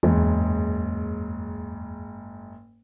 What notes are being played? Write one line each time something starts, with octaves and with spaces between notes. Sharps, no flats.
F#1 E2 G#2